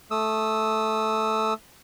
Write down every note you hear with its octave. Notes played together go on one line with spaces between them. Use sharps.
A3 D#6 E6